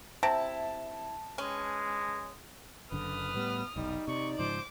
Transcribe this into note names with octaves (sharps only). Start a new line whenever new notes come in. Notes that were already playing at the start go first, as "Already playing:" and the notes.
C3 E4 A5
G#3 C#4 B4
F#1 F#2 D3 B4 D#6 F6
A2 G3 B3
F1 B1 G3 D#4
C3 D5 C#6
G#2 C#3 F3 C5 D6